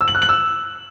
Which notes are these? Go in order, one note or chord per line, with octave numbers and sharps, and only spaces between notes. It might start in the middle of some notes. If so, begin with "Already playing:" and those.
E6
F#7
F#6
F#7
E6